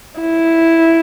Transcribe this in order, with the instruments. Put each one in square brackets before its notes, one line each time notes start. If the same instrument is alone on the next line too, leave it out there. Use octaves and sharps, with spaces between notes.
[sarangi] E4